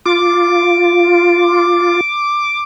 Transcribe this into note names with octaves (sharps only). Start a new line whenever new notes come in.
F4 D6